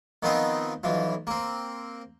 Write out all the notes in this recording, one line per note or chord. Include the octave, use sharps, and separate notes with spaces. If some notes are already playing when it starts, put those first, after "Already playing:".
D#3 F3 B3 C4 D#4
B1 E3 F3
A#3 C4